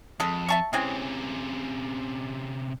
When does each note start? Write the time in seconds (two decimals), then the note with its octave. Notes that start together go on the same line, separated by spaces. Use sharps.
0.20 F2 G#3 A4
0.49 E5 A5 C#6
0.73 C3 E3 G#3 C4 C#4